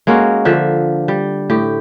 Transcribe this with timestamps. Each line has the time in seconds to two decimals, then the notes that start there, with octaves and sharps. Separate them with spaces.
0.07 G#3 A#3 C#4 F#4
0.45 D3 F3 E5
1.08 G3
1.50 A2 G4